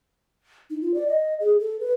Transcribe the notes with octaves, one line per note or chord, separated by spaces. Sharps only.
D#4
F4
D5
D#5
G#4
A4
B4